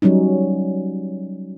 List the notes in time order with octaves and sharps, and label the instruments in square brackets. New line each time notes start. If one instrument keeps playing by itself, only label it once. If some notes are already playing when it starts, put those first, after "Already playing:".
[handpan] F#3 G3 C#4 D#4